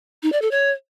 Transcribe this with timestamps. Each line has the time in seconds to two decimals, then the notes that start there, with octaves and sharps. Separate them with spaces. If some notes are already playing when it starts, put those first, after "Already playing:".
0.23 D#4
0.32 D5
0.42 A4
0.51 C#5